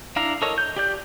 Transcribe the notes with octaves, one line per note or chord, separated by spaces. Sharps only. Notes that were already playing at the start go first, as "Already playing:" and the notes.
D4 E4 F5 A#5
A4 A#4 C#5 D#5
G6
G4 D5 G6